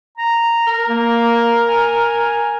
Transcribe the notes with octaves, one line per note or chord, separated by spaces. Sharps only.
A#5
A#4
A#3
G#5